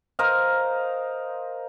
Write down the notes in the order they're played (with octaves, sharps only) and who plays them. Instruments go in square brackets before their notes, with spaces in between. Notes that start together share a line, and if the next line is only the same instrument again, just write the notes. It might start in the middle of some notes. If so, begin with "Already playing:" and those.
[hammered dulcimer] A#4 C5 D#5 F5